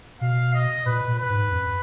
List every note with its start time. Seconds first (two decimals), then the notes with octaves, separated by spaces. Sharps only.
0.21 B2 F5
0.54 D#5
0.86 A#2 B4
1.08 A#2
1.19 B4
1.30 G#2
1.51 F#2